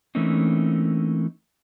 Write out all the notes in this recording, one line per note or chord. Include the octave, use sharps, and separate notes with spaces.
E3 A3 A#3 C4 C#4 D#4